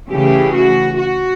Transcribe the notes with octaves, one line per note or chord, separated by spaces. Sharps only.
C#3 E3 A3 G4
F#4
F#4